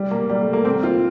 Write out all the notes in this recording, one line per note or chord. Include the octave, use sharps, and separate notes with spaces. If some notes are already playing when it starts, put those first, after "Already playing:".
Already playing: G3
A#3
G3
A3
A#3
C4
F4